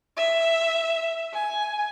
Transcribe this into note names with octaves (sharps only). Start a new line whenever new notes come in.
E5
G#5